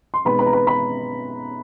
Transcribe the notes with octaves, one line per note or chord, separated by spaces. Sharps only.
C6
B2 G#3 C4 D#4 B4 B5
B4 B5
A#5
B4 B5
B4 B5